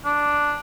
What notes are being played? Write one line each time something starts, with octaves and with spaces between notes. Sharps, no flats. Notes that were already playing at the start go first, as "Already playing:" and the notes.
D4